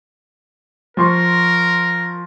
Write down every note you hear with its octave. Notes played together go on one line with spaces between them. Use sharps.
F3 A#4 C6 C#6